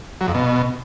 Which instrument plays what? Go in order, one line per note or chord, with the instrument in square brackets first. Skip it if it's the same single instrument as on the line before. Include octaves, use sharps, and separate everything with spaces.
[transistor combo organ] F#3
F2
B2